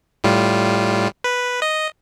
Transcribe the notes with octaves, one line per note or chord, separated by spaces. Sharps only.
A2 G3 F4
B4
D#5